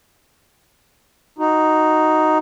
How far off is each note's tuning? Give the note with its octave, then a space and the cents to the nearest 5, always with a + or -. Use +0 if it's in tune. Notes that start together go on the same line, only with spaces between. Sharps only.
D#4 +0 F#4 +0